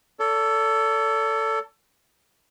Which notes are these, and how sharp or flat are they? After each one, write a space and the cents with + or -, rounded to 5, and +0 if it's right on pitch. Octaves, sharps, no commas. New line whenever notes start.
A4 +15 D5 -45